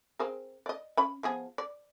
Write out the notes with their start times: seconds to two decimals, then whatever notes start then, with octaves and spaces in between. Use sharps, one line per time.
0.19 C4 G#4 A#4
0.66 D5 D#5
0.97 C#4 B5
1.23 F3 B3 G#4
1.58 D5